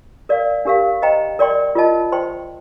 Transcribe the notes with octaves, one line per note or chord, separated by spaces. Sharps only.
A#4 D5 F5
D4 G4 A#4 F5
C5 D#5 G5 A#5
A#4 D5 G5 C6
F4 A#4 D#5 A5
C5 G5 C6